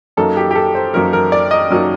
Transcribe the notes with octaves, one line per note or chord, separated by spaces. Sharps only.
F#2 F#3 A#3 D#4 A4
G4
G4
A4
C5
F#2 F#3 A#3 D#4 A#4
A#4
D5
D#5
F#2 F#3 A#3 D#4